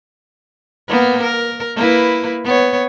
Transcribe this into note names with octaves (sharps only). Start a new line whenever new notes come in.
A#3 B3
A#4
A#3 E4 B4
B3 C#5